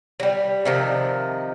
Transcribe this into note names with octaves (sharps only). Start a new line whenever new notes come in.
F#3 G3
C3 D#3 F3